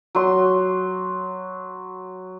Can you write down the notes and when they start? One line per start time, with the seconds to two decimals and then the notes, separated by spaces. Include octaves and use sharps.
0.15 F#3 C6